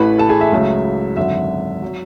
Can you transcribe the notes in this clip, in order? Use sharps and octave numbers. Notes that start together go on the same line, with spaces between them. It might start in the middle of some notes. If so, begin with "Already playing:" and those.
Already playing: A1 A2 E3 A3 B4 B5
A4 A5
G#4 G#5
E5
C#2 C#3 F#3 A3
G#1 F#2 D3 E5
F#3